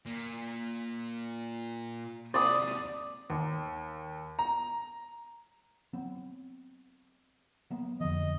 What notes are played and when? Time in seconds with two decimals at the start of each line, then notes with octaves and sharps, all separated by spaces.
0.06 A#2
2.34 D#2 C3 D5 D#6
3.30 D#2
4.39 A#5
5.93 F#3 B3 C4
7.70 F#3 A#3 B3
8.01 F2 D3 F3 D#5